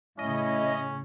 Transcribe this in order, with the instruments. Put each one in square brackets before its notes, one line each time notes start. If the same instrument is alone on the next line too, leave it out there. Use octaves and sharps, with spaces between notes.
[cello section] A2 C#3 [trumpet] C#4 [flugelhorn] E4 [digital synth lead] D#5